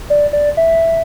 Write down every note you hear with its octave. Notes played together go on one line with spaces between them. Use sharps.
D5
D5
E5